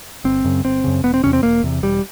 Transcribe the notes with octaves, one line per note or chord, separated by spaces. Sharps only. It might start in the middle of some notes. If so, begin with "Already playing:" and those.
G1 C4
F#2 C#3
G1 C4
F#2 C#3
E1 B3
C4
E2 C3 C#4
C4
E1 A#3
E2 C3
E1 G3